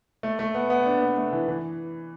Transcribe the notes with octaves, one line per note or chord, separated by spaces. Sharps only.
A3
A3
B3
B3
D4
B3
A3
E3
E3